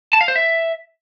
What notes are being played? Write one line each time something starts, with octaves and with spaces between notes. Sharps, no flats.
A5
F5
C5
E5